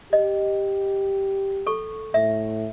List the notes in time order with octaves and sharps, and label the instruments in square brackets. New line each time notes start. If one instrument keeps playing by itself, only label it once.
[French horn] G4 [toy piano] D#5
[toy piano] A4 C#6
[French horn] A2 [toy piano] E5